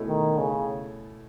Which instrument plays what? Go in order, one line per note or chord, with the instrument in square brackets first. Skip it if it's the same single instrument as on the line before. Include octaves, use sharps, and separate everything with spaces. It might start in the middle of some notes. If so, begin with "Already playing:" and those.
Already playing: [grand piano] B2 A3 C#4 E4
[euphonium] D#3
C#3